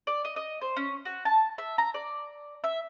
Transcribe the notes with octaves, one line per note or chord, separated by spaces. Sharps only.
D5
D#5
D#5
C5
C#4
F#4
A5
E5
A#5
D5
E5